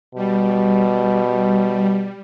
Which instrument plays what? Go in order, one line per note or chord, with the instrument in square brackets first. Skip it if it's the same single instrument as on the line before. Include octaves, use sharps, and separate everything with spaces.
[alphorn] B2 [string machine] G3